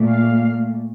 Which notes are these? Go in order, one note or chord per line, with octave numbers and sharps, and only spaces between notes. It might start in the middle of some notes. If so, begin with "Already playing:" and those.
Already playing: A#2 A3
F5